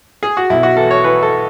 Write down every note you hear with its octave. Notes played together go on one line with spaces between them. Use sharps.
G#4
F#4
B1 E4
F#4
E3 A4
C#5
E3 B4
A4